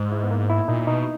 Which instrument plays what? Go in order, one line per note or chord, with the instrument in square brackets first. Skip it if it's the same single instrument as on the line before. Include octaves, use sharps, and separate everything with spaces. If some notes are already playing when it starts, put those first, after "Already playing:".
Already playing: [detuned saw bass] G#2
[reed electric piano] E4
B3
A#3
E4
[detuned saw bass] A#2 [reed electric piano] D#4
[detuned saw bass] B2 [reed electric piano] D#4